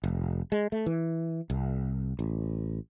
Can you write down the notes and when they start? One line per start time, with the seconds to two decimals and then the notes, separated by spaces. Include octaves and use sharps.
0.04 F1
0.52 G#3
0.72 A3
0.86 E3
1.50 C2
2.19 A1